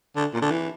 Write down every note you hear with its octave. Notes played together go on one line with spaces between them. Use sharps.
D3
A#2
D3
E3